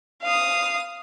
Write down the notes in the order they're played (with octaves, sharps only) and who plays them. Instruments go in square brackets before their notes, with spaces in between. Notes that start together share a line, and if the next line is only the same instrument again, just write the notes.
[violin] F5 D#6